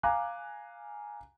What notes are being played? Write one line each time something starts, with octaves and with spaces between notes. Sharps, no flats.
F5 G#5 A#5 D6 F#6